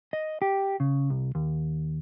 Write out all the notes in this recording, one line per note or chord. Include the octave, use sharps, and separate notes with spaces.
D#5
G4
C#3
C2
D#2